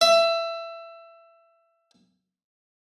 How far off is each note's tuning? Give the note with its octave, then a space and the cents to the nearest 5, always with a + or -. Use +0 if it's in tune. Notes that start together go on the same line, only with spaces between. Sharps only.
E5 +20